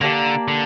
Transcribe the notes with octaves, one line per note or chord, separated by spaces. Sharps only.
D3 A#3 D4 G4 D5
D3